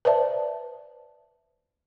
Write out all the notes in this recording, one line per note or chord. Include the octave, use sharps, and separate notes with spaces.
B4 C5 D5 E5 A5